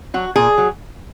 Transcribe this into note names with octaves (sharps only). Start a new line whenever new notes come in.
F#3 F#4
A#2 G#4
F#3